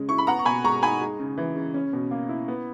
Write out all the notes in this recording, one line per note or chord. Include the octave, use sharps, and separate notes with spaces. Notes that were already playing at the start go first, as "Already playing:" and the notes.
Already playing: C#3 G#3 C#4
E4 C#6
B5
B3 F#5 A#5
C#6
B2 G#5 B5
G#3 A#5 C#6
D#4 G#5 B5
G#3
C#3
E3
C#3
C#4
B2
A#3
E4
B3